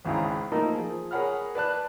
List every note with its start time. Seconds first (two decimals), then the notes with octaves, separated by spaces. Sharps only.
0.05 G#1 C#2 C#3 E4 G#4 A#5
0.52 F3 A3 A#3 D#4 A#4
0.75 F3 G#4
1.11 G#4 A#4 C#5 F#5 B5 F6
1.55 B4 D5 A5 F#6